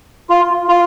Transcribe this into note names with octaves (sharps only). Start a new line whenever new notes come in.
F4
F4